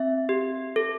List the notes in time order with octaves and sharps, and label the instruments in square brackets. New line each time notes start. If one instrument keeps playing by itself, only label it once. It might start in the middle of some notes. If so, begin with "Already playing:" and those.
Already playing: [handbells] C4 E5
G4
A4